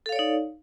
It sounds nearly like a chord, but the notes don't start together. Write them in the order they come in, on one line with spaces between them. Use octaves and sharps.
A4 F5 C#5 D5 D#4